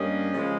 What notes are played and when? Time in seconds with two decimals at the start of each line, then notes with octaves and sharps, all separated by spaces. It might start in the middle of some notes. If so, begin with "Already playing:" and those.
Already playing: G2 G3 A#3 C#4 D#5
0.33 C#3 F3 G#3